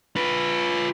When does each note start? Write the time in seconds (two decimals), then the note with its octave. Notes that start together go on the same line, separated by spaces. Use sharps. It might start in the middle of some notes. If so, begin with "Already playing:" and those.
0.16 F4 B4